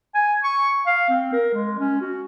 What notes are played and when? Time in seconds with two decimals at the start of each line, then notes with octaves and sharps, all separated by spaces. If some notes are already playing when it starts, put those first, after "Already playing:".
0.15 G#5
0.44 C#6
0.87 F5
1.10 C4
1.33 A#4
1.54 G#3
1.79 C#4
2.01 F#4